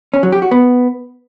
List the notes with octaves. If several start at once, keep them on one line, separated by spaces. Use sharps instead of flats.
C#4
F#3
G4
F#4
B3